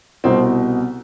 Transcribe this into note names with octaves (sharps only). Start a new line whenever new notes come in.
C2 B2 C4